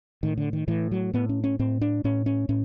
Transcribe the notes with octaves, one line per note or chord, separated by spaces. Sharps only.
A2 D#3
D3
D#3
A2 E3
F#3
A2 B3
C#4
C#4
A2 C4
D4
A2 C#4
C#4
A2 C#4